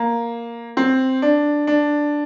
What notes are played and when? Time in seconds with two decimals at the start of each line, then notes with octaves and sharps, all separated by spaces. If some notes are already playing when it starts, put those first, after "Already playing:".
Already playing: A#3
0.77 C4
1.22 D4
1.67 D4